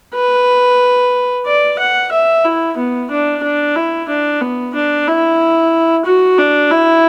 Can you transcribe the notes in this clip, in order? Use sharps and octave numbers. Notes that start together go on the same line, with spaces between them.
B4
D5
F#5
E5
E4
B3
D4
D4
E4
D4
B3
D4
E4
F#4
D4
E4